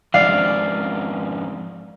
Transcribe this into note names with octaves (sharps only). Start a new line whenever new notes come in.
F2 G#2 D5 F5